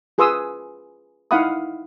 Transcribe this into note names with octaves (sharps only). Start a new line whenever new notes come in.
F4 G#4 B4 C6 D#6 E6
D#4 E4 F5 F#5 B5 D#6